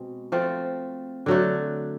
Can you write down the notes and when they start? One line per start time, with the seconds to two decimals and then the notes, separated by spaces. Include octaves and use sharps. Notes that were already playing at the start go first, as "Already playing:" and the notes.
Already playing: B2 G#3 C4
0.32 F3 A3 C4
1.26 D3 F#3 A3